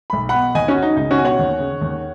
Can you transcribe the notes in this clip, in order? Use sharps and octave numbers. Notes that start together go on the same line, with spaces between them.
B1 B5
B2 F#5 B5
D#2 D#5 G#5
C#4 F#4
D#3
D#4
C#2 D#4
C#4 F#4
B2 G#5
C#5 F#5
D#2
C#3
D#2